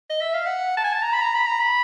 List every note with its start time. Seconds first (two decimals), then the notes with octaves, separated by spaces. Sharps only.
0.10 D#5
0.21 E5
0.34 F5
0.46 F#5
0.77 A5
0.84 G#5
0.93 A5
1.02 A#5
1.13 B5
1.21 A#5
1.35 B5
1.46 A#5
1.60 B5